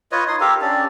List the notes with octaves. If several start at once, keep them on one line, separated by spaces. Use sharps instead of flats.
F4 B4 C#5 D#5
D#4 C6 D#6
G4 A4 A#4 F5
C#4 D4 G4 D5